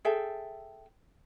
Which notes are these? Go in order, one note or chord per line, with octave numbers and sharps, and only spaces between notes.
G#4 A4 E5 G5